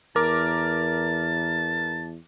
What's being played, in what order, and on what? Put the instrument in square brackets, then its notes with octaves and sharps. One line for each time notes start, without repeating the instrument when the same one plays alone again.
[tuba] E2 [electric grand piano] A#4 D6 [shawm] A5